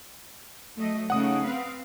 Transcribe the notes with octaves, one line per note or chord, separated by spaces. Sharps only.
F#3 A3 D#5
C#3 A3 D#4 F#5 D#6
C4 B4 F5